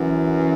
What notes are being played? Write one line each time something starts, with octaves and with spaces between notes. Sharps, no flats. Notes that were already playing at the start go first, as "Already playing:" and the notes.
Already playing: F#2 E3